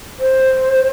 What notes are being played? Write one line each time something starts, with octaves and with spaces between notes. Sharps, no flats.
C5